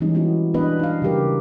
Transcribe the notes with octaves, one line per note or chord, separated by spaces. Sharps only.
E3 G3 G#3 C#4 D#4 G4
B3 D#4 E4 F#4
B3 D4 B4 D#5
D#4 F5
C#3 G3 G4 A#4